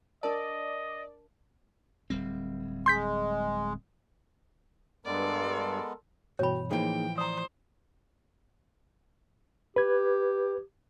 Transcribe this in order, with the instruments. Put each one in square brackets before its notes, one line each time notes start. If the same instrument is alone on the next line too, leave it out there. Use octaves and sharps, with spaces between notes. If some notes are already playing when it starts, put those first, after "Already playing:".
[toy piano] D4 A#4 A5 [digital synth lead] D5 [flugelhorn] D#5
[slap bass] D1 G3 C4
[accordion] G#3 [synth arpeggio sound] C6 G6 B6
[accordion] G2 [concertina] G#3 B3 [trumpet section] A4 A#4 C6 [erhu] D5
[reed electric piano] G2 B2 E3 [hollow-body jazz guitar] F#4 G5 [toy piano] C#5 B5
[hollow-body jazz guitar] A2 E3 F3 [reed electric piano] A#3 D#4 G#4 [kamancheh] G5
[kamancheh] C5 [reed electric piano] D5 [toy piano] A#5 D#6
[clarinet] G4 [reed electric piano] B4 G#6